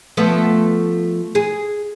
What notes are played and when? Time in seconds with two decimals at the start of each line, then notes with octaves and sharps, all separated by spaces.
0.17 F3 A3 B3
1.35 G#4